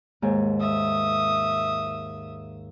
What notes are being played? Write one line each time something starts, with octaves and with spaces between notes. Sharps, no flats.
D#2 G#2 G#5
E5 D#6